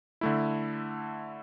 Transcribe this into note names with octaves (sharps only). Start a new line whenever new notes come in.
D3 A3 E4